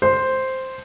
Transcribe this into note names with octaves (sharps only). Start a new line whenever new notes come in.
C5